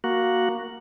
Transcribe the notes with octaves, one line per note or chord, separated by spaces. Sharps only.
A#3 F#4